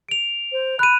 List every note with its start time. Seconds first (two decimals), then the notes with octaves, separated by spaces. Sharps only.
0.09 D7 F7
0.52 C5
0.79 B5 F#6 D#7